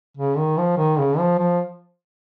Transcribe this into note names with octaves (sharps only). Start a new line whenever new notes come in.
C#3
D#3
F3
D#3
C#3
F3
F3